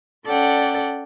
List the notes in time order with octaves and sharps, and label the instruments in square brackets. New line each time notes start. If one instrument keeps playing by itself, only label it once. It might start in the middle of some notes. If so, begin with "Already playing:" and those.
[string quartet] C#4 A4 D5 F#5 G5